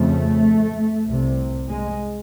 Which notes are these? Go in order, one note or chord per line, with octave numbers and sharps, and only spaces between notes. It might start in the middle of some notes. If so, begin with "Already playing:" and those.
Already playing: F2 C#3 A3
C2 C3
G#3